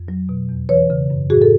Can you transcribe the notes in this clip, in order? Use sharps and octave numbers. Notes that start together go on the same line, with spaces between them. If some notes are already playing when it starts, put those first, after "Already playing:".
Already playing: F2
F#3
B2
E2
E3 B4 C#5
C#3
F#2
A2 F#4 G#4
A4